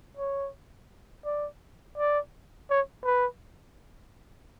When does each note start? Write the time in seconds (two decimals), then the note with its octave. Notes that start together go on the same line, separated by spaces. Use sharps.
0.17 C#5
1.25 D5
1.98 D5
2.70 C#5
3.05 B4